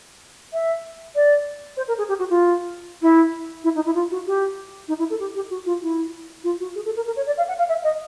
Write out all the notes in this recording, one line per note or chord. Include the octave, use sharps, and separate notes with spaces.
E5
D5
C5
A#4
G#4
G4
F#4
F4
E4
E4
D#4
E4
F4
F#4
G4
D#4
E4
A4
G4
G4
F#4
F4
E4
F4
F#4
G#4
A4
A#4
A#4
C#5
D5
F5
F#5
F5
E5
D#5